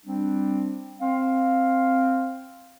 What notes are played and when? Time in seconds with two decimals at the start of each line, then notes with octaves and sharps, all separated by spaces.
0.04 G3 C4 D4
1.00 C4 F5